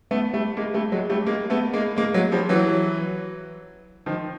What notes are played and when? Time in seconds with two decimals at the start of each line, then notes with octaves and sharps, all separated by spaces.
0.11 A3 B3
0.34 G3 A3
0.57 G#3 A#3
0.74 G3 A3
0.92 F#3 G#3
1.10 G3 A3
1.27 G#3 A#3
1.50 A3 B3
1.73 G#3 A#3
1.96 G#3 A#3
2.14 F#3 G#3
2.32 F3 G3
2.49 E3 F#3
4.06 D#3 F3